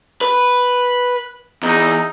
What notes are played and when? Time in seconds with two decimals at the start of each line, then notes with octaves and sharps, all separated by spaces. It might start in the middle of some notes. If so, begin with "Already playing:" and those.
0.21 B4
1.63 E2 D#4